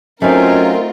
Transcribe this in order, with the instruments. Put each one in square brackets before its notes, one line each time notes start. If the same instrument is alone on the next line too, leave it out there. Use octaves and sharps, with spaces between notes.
[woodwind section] F#3 C#4 [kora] A3 D#4 [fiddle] C4 [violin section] F4 A#4